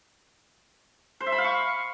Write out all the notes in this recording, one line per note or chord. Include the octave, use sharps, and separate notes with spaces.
C5
E5
B5
F5
C#6